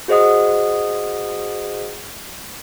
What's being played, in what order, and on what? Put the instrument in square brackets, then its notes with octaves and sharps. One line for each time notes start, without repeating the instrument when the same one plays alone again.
[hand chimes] F#4 G#4 C5 D#5 F#5 D#6